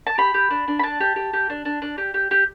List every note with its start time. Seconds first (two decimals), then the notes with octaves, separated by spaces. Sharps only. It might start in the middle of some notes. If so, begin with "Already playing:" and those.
0.07 A5
0.18 G4 B5
0.34 G4
0.50 D4
0.68 D4
0.79 B5
0.83 D4 A5
1.00 G4
1.16 G4
1.33 G4
1.50 D4
1.65 D4
1.82 D4
1.98 G4
2.14 G4
2.31 G4